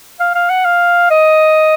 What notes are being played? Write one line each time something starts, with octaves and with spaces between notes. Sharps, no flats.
F5
F5
F#5
F5
D#5